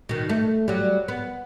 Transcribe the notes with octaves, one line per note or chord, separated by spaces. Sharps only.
B2 D#3
A3
F#3 G3
B3